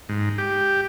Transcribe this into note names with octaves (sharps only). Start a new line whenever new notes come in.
G#2
G4